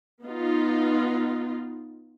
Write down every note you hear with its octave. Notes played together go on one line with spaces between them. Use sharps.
B3 D#4 F4